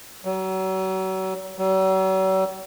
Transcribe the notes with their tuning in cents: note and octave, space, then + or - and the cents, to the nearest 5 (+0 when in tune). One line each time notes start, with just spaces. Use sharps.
F#3 +35
F#3 +45